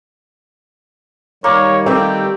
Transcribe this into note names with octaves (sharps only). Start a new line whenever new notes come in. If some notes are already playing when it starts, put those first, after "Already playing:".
D#3 G3 A#3 C#5
A3 C4 G4